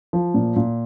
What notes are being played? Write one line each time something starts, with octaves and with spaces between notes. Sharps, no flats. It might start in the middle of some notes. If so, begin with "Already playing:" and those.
F3
A#2
A#2